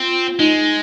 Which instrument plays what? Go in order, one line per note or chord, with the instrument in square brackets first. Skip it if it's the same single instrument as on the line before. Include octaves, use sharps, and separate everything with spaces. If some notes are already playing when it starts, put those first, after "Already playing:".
Already playing: [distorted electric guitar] C4 [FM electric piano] F4
[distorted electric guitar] G#3 [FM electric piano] D#4